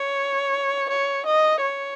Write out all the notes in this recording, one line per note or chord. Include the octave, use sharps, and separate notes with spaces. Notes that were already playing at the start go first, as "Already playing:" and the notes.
Already playing: C#5
C#5
D#5
C#5